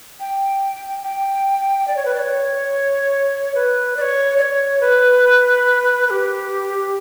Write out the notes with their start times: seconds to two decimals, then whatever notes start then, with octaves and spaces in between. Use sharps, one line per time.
0.20 G5
1.03 G5
1.88 D5
1.96 C#5
2.05 B4
2.14 D5
2.19 C#5
3.55 B4
3.97 D5
4.02 C#5
4.39 D5
4.42 C#5
4.81 B4
6.07 B4
6.10 G4